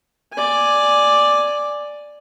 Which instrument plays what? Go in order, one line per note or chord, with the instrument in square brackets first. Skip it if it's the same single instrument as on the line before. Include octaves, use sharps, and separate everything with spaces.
[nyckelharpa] D5 G#5